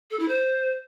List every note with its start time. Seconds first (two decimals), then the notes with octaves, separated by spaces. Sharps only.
0.11 A4
0.20 E4
0.28 C5